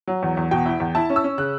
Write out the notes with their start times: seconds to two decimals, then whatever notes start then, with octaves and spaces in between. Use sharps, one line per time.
0.08 F#3
0.23 E2
0.37 E2
0.51 B2 G5
0.66 E4
0.80 E2
0.95 E4 A5
1.10 C#4
1.16 E6
1.24 C#4
1.38 C#3 F#6